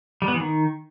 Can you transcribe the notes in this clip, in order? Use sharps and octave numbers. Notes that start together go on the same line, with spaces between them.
G3
B3
E3
D#3